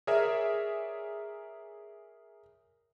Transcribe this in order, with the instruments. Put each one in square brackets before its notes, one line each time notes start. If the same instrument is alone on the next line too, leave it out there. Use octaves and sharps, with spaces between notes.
[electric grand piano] G#4 A#4 C#5 D5 E5